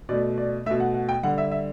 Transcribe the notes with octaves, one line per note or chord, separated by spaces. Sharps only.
B2 A3 D5
D5
B2 A3 E5
F#5
F#5
G5
D3 G3 F#5
E5
E5